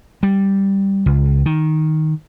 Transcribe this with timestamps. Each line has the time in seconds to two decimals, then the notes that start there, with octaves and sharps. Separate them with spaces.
0.23 G3
1.06 C#2
1.46 D#3